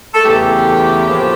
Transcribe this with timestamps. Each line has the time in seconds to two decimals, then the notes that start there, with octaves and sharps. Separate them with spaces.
0.14 A4
0.24 E2 C#3 E3 A3 G4
1.08 A2 F3 A#3